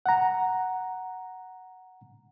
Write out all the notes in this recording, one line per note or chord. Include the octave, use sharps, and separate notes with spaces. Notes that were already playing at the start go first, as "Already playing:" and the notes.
F#5 A#5